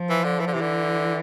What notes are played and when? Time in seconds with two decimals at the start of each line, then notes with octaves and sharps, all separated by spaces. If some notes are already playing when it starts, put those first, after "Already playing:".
Already playing: F3
0.10 E3
0.24 D3
0.40 E3
0.47 D3
0.53 C3 E3
0.61 D3